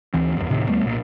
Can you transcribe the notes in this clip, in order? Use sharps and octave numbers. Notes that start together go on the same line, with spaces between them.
D2 E3 C4
G1 E2
D1 A2 C3 D#3
D#2 G3 A3 B3
B1 A#2